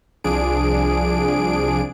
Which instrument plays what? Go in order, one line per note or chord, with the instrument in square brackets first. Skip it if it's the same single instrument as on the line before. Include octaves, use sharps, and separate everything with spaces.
[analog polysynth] C2 F3 D4 G#4 D7